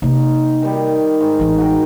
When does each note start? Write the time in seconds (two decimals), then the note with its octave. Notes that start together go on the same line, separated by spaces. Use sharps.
0.02 C3 A#3 D#4
0.62 D#3 G3
1.20 G#2
1.39 A1 E3
1.58 F#4 A#4 G5